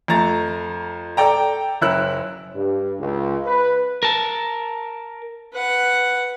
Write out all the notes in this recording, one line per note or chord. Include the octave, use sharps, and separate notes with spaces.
F2 A3 A#5 A6
A4 D5 G5 A#5
F#1 C#4 E4 A#4 E6 F#6
G2
C#2
B4
A#4 A5
B4 F#5